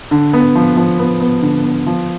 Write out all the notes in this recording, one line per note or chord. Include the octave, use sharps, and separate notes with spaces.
D3
B3
F3
F3
B3
B3
D3
B3
F3